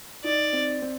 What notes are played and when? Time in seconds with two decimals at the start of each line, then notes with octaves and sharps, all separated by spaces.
0.24 D#4 D5
0.53 C4
0.82 C4